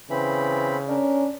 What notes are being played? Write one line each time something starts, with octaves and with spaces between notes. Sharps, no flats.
C#3 E3 C4 B5
C#4 D4 A#4